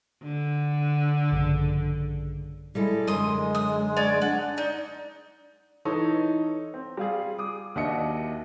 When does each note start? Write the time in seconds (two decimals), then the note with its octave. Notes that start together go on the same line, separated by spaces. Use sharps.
0.23 D3
1.32 A#1 G2 C#3
2.75 G3 G#3 E4 A4
3.07 F#2 D3 G#3 C6 D#6
3.55 D#6
3.97 C#5 D5 G#5
4.22 D4 F#5
4.58 D#4 D5
5.85 E3 D#4 A4 C#5 D#5
6.74 C4
6.97 G3 F4 G#4
7.38 D6 D#6
7.76 D#2 D4 F#4 D#5 E5 C#7